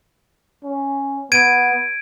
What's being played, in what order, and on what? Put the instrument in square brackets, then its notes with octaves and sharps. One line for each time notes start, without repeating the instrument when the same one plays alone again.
[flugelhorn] C#4
[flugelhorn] B3 [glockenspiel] G#6 D7 D#7